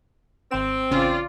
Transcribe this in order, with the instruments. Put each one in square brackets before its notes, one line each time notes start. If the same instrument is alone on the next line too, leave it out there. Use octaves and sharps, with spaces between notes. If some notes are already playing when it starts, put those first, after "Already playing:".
[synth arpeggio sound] G#1 E7 [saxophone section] C4
[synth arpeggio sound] A1 C#3 C#4 [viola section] F4 D5